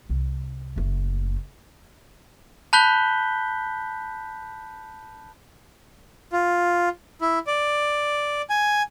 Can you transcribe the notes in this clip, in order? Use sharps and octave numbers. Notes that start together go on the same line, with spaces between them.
C2
F#1 A3
A5 B5 F#6 G6 B6 G7
F4
E4
D5
G#5